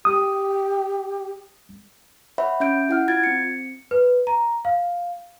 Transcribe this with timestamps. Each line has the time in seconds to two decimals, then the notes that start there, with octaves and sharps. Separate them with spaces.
0.05 G4 D#6
2.38 C#5 E5 F#5 B5
2.60 C#4 E5 G6 D7
2.89 E4 F#5 F6
3.08 F4 G#6 A6 D7
3.24 C4 C#7
3.91 B4
4.27 A#5
4.65 F5